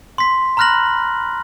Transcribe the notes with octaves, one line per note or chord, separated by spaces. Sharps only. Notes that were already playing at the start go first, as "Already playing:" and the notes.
C6 B6
A#5 B5 F6 F#6 A#6 F#7